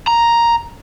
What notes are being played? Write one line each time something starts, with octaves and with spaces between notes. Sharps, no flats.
A#5